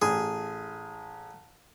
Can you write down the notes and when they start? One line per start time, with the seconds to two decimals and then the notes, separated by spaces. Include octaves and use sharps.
0.02 A1 G#4